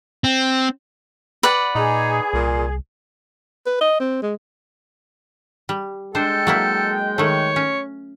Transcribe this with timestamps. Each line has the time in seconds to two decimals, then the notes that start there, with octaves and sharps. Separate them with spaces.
0.24 C4
1.43 B4 D5 F#5
1.75 A#2 D#4 G#4
2.34 C2 A#2
3.66 B4
3.81 D#5
4.00 C4
4.23 G#3
5.69 G3
6.15 G#3 D4 A4 C5 G5
6.47 F#3 A#3 E4
7.18 D#3 A3 C#5
7.56 C#4